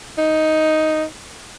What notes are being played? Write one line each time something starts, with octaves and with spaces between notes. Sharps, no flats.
D#4